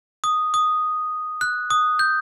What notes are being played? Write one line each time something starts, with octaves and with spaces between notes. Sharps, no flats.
D#6
D#6
F#6
D#6
G6